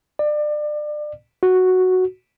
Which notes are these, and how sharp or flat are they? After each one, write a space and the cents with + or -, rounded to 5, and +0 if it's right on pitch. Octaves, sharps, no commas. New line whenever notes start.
D5 +30
F#4 +0